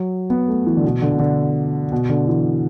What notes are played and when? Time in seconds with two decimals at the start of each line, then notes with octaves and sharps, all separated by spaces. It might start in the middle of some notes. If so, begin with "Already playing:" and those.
Already playing: F#3
0.30 B3
0.48 A3
0.66 E3
0.77 D3
0.84 B2
1.02 D3
1.12 B2
1.19 D3
1.92 B2
2.09 D3
2.28 E3